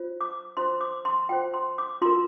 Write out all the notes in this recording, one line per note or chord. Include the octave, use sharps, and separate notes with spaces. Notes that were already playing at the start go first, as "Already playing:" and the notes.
Already playing: F4 C5
D6
F4 C5 C6
D6
C6
F4 C5 G5
C6
D6
F4 A#4 C6